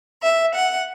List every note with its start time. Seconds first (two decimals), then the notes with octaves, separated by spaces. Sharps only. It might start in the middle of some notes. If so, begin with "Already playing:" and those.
0.23 E5
0.54 F#5